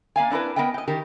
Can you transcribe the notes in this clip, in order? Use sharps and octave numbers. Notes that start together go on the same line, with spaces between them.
A#3 D5 F5 G#5
C4 D4 E4 A#4 B4
B3 A#4 B4 D#5 G5
D#5 G5
D#3 G4 A#4